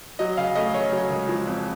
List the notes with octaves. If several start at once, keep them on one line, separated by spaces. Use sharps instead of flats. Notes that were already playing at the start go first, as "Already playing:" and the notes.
F#3 D#5
C#3 F5
A3 D#5
C#3 C#5
F#3
C#2
F3
F2